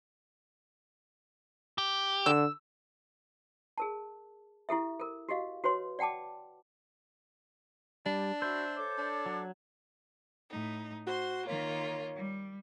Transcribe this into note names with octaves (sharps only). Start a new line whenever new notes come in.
G4
D3 E6
G#4 A#4 A5
E4 G4 A4 E5
A4 A#4
F#4 G4 D#5 F5
F#4 B4 C#5 C6
D5 F#5 G5 A5 D6
G3 D4 A5
F#4 C5 E5 B5 E6
A4 C#5 D6
D4
F#3
A2 D#4
F#4 C5 C6
D#3 A#3 F4 C#5
G3